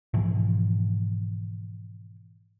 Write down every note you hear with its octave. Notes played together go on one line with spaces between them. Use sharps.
G#2 B2 E3 F3